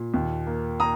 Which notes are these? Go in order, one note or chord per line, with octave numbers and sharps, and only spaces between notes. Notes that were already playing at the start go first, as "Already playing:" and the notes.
Already playing: A#2
D#2
A#3
A#3 A#5 D#6